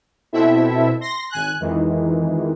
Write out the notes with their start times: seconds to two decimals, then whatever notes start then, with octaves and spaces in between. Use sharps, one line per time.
0.33 B2 C4 E4 A4 E5
1.00 C6 A#6
1.30 G#1 G#5 F#6
1.60 F2 D#3 E3 G#3